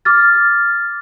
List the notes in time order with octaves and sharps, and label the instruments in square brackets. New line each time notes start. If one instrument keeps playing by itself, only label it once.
[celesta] D6 F6 A6